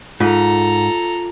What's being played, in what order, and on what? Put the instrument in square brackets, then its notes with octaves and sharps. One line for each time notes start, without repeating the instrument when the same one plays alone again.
[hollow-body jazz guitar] G#2 [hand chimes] F4 [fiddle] A4 A#5